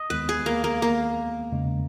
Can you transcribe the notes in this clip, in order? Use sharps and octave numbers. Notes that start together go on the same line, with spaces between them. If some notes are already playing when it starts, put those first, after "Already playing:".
Already playing: D#5
D#2 D#3 G#3 B3 B4
G#4
A#3
A#3
A#3
E2 C#3 G#3